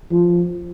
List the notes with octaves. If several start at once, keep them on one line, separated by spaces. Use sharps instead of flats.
F3